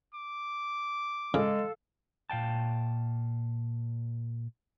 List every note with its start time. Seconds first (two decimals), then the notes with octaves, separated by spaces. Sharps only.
0.14 D6
1.34 C#3 G#3 A4 F5
2.30 A#2 F5 G5 A5